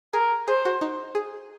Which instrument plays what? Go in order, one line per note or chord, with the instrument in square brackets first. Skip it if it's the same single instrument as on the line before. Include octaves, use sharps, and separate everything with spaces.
[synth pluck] G#4 [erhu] A#4
[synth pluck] G#4 [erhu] C5
[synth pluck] F#4
D#4
G#4